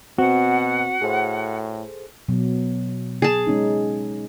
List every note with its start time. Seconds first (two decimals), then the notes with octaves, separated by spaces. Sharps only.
0.18 B2 C4 F#4 F#5
1.02 A2 G#4 A4 C5
2.29 B2 F#3
3.22 G#4 A5
3.47 G#3 C#4 D#4